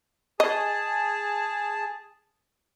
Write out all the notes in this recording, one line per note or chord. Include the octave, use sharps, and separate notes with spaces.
G#4 D#5 A5